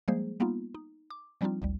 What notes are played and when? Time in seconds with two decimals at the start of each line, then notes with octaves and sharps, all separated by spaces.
0.08 F3 G3 G#3 A#3 G#4 C5
0.40 G3 A#3 B3 D#4 F4
0.75 D#4
1.10 D6
1.41 F3 G3 C4 D4 D#4 F4
1.62 G#1 D2 G3